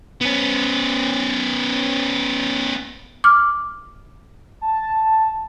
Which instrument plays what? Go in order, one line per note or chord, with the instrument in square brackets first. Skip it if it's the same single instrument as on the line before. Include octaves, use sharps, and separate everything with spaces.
[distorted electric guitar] B3 C#4
[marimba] D6 F6
[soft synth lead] A5